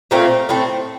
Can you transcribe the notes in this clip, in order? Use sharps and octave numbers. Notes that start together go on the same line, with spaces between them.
A#2 A3 C4 F4
A2 A3 C4